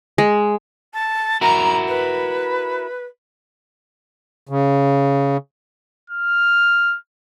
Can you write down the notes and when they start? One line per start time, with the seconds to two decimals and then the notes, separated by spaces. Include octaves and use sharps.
0.18 G#3
0.93 A5
1.41 E4 F#4 A#4 A#5
1.88 B4
4.49 C#3
6.10 F6